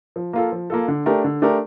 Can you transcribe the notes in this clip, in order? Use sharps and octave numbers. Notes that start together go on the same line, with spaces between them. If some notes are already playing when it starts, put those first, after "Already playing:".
F3
A#3 F4 A4
F3
A#3 F4 A4
D3
A3 D4 G4 A#4
D3
A3 D4 G4 A#4